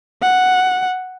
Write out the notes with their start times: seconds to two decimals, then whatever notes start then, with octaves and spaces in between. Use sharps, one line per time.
0.22 F#5